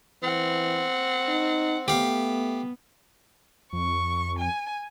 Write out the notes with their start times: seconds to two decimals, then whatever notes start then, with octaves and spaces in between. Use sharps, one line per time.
0.23 E3 C4 F#5
1.28 D#4
1.88 A3 B3 G4 F5
3.73 F2 C#6
4.38 G#5